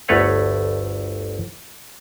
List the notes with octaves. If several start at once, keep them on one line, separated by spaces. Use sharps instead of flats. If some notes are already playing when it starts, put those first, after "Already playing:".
G1 D2 A3 B4 C#5 F5